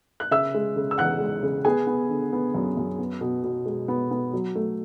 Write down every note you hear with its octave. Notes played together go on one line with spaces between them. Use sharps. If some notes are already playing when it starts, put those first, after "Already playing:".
F#6
C#3 E5 E6
G#3
C#3
E6
E2 F#5 F#6
G#3
C#3
B3 G#4 G#5
B3
D3
B3
F#2
F#2
B3
B2
B2
G#3
B3
B3
F#3
A3